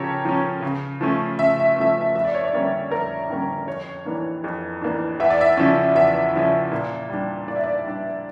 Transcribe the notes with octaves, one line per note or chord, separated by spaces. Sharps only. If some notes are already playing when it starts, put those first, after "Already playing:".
Already playing: C#3 F3 C#4 G4 A4 A#4 C#5
F3 C#4
C#3
F3 A3 C#4
C#3 E5
E5
F3 A3 C#4 E5
E5
F2 E5
D5
C#5
D5
D3 G3 A#3 C#4
F2 A#4
D3 G3 A#3 C#4
F2 C#5
E3 A#3 D4
F2
E3 A#3 D4
E2 E5
D5
E5
C#3 F3 C#4
E2 E5
C#3 F3 C#4
A#2
G3 D4
A#2 D5
E5
D5
G3 D4